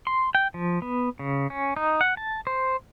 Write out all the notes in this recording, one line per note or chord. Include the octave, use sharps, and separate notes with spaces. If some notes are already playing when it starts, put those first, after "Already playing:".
C6
G5
F3
B3
C#3
C#4
D#4
F#5
A5
C5